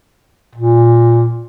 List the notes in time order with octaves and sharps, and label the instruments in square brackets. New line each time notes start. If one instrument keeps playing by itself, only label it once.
[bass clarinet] A#2